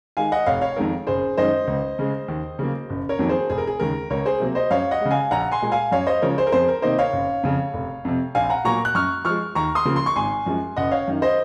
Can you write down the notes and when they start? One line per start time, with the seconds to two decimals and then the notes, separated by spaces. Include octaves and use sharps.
0.17 D#3 G#3 F5 G#5
0.32 D#5 F#5
0.46 F1 C#5 F5
0.61 C#5 F5
0.76 F2 D#3 G#3 A#4
1.07 F#1 G#4 C5
1.37 F#2 D#3 G#3 C5 D#5
1.67 C#2
1.99 C#3 G#3
2.28 D#2
2.59 C#3 F#3 A#3
2.90 F#1
3.09 A#4 C#5
3.19 F2 D#3 F#3 A#3
3.29 G#4 C5
3.50 F1 G#4
3.58 A#4
3.67 G#4
3.80 D#2 C#3 G#3 A#4
4.10 C#2 A#4 C#5
4.26 G#4 C5
4.40 C3 F#3 A#3
4.55 C5 D#5
4.70 F#2 C#5 F5
4.91 D#5 F#5
5.01 C#3 G#3
5.11 F5 G#5
5.31 A#1 F#5 A#5
5.52 G#5 C6
5.62 A#2 G#3
5.72 F5 G#5
5.92 F#2 C#5 F5
6.07 C5 D#5
6.22 C#3 F3 G#3 A#4 C#5
6.38 G#4 C5
6.47 A#4
6.52 F2 G#4 C5
6.68 A#4
6.82 C3 D#3 A#3 C5 D#5
6.98 C#5 F5
7.13 F#1
7.43 F2 C#3
7.74 F1
8.05 F2 C3
8.35 A#1 F5 G#5
8.50 F#5 A#5
8.65 A#2 F#3 A#3 A#5 C#6
8.85 F#6
8.95 F#2 C#6 F6
9.25 F3 G#3 C#6 F6
9.55 D#2 A#5 C#6
9.75 C6 D#6
9.85 C#3 F3 A#3
9.96 C6
10.06 C#6
10.16 G#1 G#5 C6
10.46 F#2 F3 G#3
10.77 F#1 D#5 F#5
10.91 C#5 F5
11.08 F#2 D#3
11.22 C5 D#5